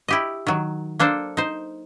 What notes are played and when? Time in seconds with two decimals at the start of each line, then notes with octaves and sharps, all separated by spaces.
0.08 E4 G4 D#5
0.47 D#3 F#3
0.99 A#3 D4 A4 C5
1.37 D#4 C5